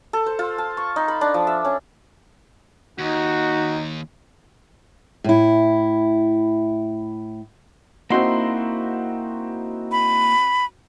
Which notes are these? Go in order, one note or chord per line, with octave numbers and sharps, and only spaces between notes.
A4
C5
F4
A5
C#6
D#4
B5
D4
F3
E5
C#4
D#2 D#4 F#4
A2 E4
A#3 C4 D#4 E4 F#4 C6
B5